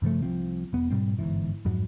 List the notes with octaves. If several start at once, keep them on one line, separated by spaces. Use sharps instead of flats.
G2 C#3 F3 A3
C2 F3 C4
E1 B3
G#2 B2 G3 C4
G1 C#2 G#2 E3
F2 G#2 F#3